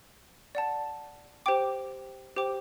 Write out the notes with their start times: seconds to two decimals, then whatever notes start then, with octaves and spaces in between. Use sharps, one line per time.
0.55 D5 F#5 A5
1.46 G4 C5 G5 D6
2.36 G4 C5 G5 D6